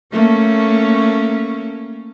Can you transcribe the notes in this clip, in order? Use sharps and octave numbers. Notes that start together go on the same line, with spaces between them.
A3 A#3 C#4